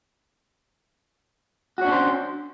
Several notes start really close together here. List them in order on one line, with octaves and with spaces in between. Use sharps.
F#4 C#5 D4 C#4 C5